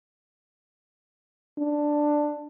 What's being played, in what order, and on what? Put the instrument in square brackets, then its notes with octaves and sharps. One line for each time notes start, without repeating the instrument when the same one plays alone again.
[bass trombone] D4